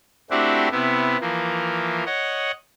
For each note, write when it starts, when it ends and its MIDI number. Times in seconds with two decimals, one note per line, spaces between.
0.31 0.68 57
0.31 0.68 60
0.31 0.68 62
0.31 0.68 64
0.31 0.68 66
0.31 0.68 67
0.71 1.17 48
0.71 1.17 59
0.71 1.17 64
1.21 2.04 52
1.21 2.04 53
1.21 2.04 58
2.06 2.51 73
2.06 2.51 75
2.06 2.51 78